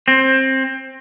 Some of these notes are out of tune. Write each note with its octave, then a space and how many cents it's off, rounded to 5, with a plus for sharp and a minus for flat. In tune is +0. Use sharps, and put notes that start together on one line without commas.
C4 +20